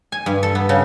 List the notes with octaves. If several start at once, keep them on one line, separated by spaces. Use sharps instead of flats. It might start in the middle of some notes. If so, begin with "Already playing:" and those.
G#5
G2
A4
B3
C#3